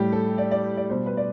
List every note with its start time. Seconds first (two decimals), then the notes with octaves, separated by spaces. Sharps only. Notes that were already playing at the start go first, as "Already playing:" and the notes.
Already playing: A2 G3 G4
0.12 A4
0.38 D5
0.51 D5
0.77 D5
0.90 B2 G3 C5
1.06 B4
1.17 D5